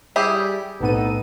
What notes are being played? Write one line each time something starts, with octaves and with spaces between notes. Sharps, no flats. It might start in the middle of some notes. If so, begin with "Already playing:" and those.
G3 E4 G4 G#4
B1 A2 B3 C4 D#4 A4 D#7